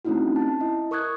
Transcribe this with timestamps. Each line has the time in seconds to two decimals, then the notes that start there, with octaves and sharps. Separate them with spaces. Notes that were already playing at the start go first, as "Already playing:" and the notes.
0.05 A3 C4 C#4 D#4 E4 F#4
0.36 A5
0.61 E4 D#5
0.91 A#4 C#6 D#6 F#6 G#6